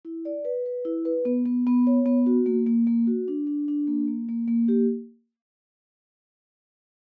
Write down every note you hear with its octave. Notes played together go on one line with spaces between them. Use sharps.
E4
D5
B4
B4
E4
B4
B3
B3
B3
C#5
B3
F#4
A#3
A#3
A#3
F#4
D4
D4
D4
A#3
A#3
A#3
A#3
G4